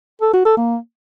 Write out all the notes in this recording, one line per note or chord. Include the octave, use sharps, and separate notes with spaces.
A4
F#4
A4
A#3